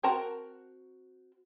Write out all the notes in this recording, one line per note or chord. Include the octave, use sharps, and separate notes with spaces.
C4 F#4 A#4 A5 A#5